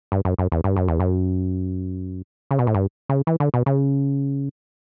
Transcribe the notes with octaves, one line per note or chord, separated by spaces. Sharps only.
G2
F#2
F#2
E2
G2
F#2
E2
F#2
C#3
B2
A2
G2
C#3
E3
D3
B2
C#3